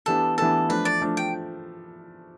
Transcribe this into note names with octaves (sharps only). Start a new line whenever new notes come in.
E3 B3 D4 G4 A4
E3 B3 D4 G4 A4
F3 A3 D4 B4
D5
F3 A3 D4
G5